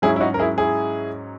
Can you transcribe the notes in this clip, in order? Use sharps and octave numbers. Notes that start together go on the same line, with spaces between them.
G#2 F#3 C#4 E4 G#4
E4
D#4 F#4
A#4
E4 G#4
E4 G#4